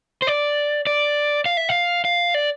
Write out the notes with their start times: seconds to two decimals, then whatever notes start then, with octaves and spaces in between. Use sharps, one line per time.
0.22 C5
0.27 D5
0.87 D5
1.46 F5
1.57 E5
1.69 F5
2.05 F5
2.34 D5